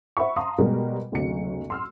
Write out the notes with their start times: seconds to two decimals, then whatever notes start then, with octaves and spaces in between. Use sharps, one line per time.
0.17 C5 E5 F#5 B5 C#6
0.36 F5 A5 A#5 C6 D#6
0.58 B2 G3 G#3 A#4
1.12 F#1 D2 C3 F#3 C#7
1.70 C6 E6 F6